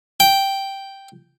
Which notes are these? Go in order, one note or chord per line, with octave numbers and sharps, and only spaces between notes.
G5